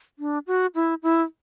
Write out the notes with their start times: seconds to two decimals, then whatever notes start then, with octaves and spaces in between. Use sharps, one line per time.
0.19 D4
0.47 F#4
0.75 E4
1.03 E4